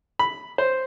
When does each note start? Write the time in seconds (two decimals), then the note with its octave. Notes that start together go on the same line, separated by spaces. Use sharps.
0.19 B5
0.58 C5